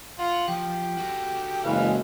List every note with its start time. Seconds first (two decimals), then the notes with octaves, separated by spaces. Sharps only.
0.19 F4 F#5
0.48 F3 G4
0.97 F#4 A4
1.64 F#1 E3 G#3 F5